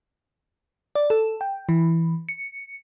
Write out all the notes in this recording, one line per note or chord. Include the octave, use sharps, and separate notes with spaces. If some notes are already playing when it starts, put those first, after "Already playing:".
D5
A4
G5
E3
C#7